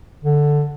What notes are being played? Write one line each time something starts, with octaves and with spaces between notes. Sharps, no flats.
D3